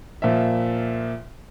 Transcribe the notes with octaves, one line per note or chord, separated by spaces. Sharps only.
A#2 F3 E5